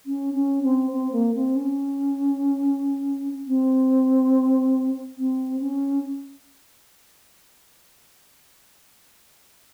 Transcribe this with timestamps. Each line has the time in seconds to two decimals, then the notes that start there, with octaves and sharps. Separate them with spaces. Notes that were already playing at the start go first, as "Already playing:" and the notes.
0.06 C#4
0.34 C#4
0.63 C4
0.92 C4
1.12 A#3
1.34 C4
1.55 C#4
3.47 C4
5.18 C4
5.60 C#4